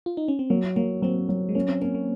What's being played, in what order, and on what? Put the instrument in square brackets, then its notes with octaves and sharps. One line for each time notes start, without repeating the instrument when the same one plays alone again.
[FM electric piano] F4
D#4
C#4
C4
[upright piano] F#3 [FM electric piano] A#3
[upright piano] F#3 [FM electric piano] A#3
[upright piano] F#3 [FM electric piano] C4
[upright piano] F#3
[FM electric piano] G#3
[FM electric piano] A#3 [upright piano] C#4
[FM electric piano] C4
[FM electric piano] A#3 [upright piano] C#4
[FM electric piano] A#3